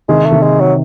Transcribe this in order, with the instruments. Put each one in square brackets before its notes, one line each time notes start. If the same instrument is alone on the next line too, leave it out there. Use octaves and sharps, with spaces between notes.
[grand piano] C3 D#3 [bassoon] G#3
[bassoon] A3
[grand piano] C3 D#3
[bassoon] G#3
F#3